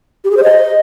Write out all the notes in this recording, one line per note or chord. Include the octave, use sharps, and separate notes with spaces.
G4
G#4
C5
D#5